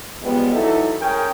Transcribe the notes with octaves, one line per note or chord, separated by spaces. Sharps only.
C#3 F3 G3 G#3 B3
E3 F#3 D#4 E4 A4
C#4 G#4 A#4 G5